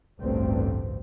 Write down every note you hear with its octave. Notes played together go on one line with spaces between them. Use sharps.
A1 D2 G2 C4